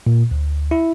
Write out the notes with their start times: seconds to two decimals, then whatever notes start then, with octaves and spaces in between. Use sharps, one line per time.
0.07 A#2
0.31 D2
0.71 E4